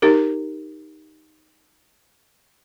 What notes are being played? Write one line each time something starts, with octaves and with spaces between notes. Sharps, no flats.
D#4 G4 A#4